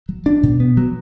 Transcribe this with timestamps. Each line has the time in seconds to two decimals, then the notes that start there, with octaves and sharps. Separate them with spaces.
0.09 F#3
0.26 D4
0.43 B2
0.60 B3
0.77 F#3